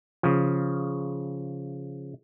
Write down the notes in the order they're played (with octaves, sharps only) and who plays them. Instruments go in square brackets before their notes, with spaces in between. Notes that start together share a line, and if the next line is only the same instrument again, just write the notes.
[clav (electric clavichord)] C#3 F3